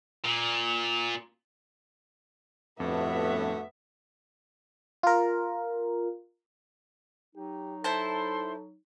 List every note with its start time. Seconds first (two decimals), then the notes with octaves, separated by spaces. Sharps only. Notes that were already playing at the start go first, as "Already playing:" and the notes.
0.25 A#2
2.80 G1 F2 A2 A3 B3 F#4 E5
5.03 F4 A#4
7.36 F#3 D#4 G4
7.84 E4 A4 C5 A5 C6